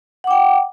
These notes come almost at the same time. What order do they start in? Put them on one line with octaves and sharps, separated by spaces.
F#5 D6 G5